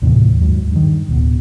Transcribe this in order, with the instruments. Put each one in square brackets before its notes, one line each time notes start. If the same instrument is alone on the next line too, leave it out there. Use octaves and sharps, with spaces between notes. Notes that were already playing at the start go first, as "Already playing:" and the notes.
[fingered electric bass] D#2 A2 C3 E3
D#2 G#2 F#3
G2 D#3
D1 B2